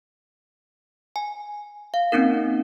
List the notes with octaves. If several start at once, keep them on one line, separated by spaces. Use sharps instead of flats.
G#5
F5
A#3 C4 C#4 D#4 A#4